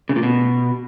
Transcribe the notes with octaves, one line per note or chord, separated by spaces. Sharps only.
C#3
A#2
B2